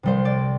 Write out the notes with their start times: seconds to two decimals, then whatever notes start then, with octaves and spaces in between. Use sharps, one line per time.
0.03 C2 C3 G3 C5
0.25 D5